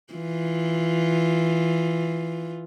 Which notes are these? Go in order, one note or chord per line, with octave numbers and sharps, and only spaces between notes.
E3 F4